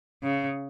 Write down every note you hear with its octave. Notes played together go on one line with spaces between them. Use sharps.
C#3